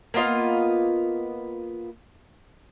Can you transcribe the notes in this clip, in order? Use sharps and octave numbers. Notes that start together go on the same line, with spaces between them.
A#3 B3 F4 D#5